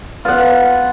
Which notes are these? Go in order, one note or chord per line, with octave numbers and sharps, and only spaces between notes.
B3 F4 F#5